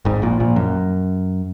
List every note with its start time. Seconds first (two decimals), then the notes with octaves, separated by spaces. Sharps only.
0.05 G#1 G#2
0.22 A#1 A#2
0.40 A#1 A#2
0.56 F#2